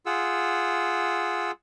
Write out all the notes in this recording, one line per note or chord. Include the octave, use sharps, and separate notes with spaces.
F4 G#4 F#5 E6